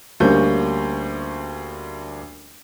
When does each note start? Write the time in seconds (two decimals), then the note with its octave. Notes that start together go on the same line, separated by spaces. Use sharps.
0.20 D2 G3 A#3 C#4 G6